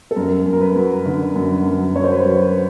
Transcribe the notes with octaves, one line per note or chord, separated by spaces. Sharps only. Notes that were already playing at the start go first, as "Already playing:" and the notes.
A4
F#2 A#4
F#2
A#4
B4
F#3
D3
F#2
F#2
F#3 C#5
C5
B4
C5
F#3